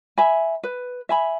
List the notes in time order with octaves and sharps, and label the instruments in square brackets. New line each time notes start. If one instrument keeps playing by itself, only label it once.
[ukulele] E5 G#5 B5
B4
E5 G#5 B5